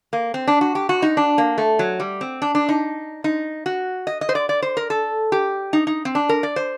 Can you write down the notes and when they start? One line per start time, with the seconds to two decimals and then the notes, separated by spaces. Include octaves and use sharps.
0.13 A#3
0.34 C4
0.48 D4
0.61 F#4
0.75 G4
0.89 F#4
1.02 D#4
1.17 D4
1.38 A#3
1.58 A3
1.79 F#3
2.00 G3
2.21 C4
2.42 D4
2.55 D4
2.69 D#4
3.24 D#4
3.66 F#4
4.07 D#5
4.21 D#5
4.29 C5
4.35 D5
4.49 D5
4.62 C5
4.77 A#4
4.90 A4
5.32 G4
5.73 D#4
5.87 D#4
6.05 C4
6.15 D4
6.29 A#4
6.43 D5
6.56 C5